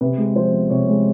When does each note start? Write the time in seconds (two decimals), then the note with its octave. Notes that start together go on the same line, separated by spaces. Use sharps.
0.01 C3 B4
0.18 G#3
0.35 F3 C5
0.53 B3
0.70 C3 C#5
0.88 G#3